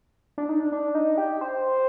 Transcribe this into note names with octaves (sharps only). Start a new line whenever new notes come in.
D4
D#4
D4
D4
D#4
G4
C5